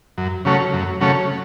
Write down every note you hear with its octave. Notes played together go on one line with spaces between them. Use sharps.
F#2
C#3 F#3 A3 C#4
F#2
C#3 F#3 A3 C#4